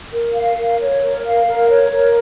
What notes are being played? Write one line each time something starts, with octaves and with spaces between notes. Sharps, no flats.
A#4
F5
A#4
C#5
A#4
F5
A#4
C#5
A#4